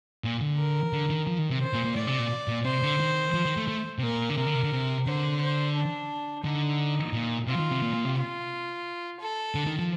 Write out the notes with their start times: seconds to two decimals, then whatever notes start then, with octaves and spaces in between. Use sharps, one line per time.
0.24 A#2
0.41 D3
0.58 A#4
0.93 D3
1.10 D#3
1.27 F3
1.38 D#3
1.50 C3
1.61 C5
1.73 A#2
1.85 A#2
1.96 A2 D5
2.07 C3
2.19 A#2
2.48 A#2
2.65 C3 C5
2.83 D3
3.00 D#3
3.34 F3
3.45 D#3
3.57 A3
3.68 A3
3.98 C3
4.03 A#2 A#4
4.30 D3
4.37 C3 A#4
4.47 D3
4.55 C3
4.63 D3
4.72 C3
5.06 D3 C5
5.41 C5
5.75 D4
6.44 D3 D#4
7.13 A#2
7.47 C3 F4
7.55 F3
7.60 D#3
7.71 C3
7.82 A#2
7.94 A#2
8.05 C3
8.17 F4
9.20 A4
9.55 D3
9.67 D#3
9.79 F3